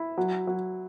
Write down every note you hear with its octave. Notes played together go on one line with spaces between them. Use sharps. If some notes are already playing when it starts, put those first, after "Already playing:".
Already playing: E4
F#3
F#3